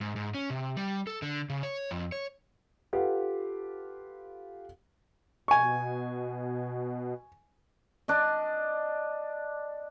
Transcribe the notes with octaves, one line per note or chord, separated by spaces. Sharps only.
G#2
G#2
C#4
C3
G3
A4
D3
C#3
C#5
F2
C#5
F4 G4 A4 B4 F#5
B2 G#5 C#6
D4 D#5